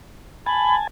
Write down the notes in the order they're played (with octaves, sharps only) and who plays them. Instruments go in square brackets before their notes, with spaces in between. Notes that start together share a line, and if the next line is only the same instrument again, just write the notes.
[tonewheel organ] G#5 A5 [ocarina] B5